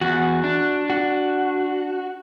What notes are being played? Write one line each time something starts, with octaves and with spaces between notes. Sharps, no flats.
E2 F#4
D4
F#4